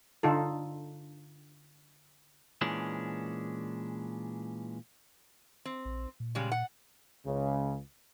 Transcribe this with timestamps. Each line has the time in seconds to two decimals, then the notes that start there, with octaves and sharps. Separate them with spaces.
0.23 D3 D#4 F4 A4
2.61 A#2 E3 G#3 C#4 D4
5.65 C4
5.85 A#1
6.20 A#2
6.35 C#3 G3 G#3
6.52 F#5
7.26 C#2 C#3